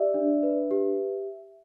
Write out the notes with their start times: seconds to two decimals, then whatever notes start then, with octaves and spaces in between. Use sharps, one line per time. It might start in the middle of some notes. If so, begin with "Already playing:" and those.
Already playing: G4 D5 E5
0.14 D4
0.43 B4
0.71 G4